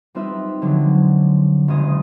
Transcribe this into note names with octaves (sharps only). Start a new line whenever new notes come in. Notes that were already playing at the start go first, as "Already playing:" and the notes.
G3 C4 D#4 F4 B4 E5
D3 F3 F#3 G#3
F#1 B1 G#3 D#6